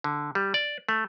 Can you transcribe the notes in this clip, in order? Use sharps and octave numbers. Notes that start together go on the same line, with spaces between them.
D3
G3
D5
A3